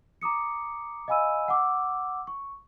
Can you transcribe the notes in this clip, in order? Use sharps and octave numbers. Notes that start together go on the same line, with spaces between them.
A#5 D6 D#6 C#7
D#5 F5 G#5 B5 E6 D#7
F#5 D6 E6
C#6